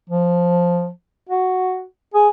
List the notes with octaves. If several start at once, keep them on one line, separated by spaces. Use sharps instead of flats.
F3
F#4
G#4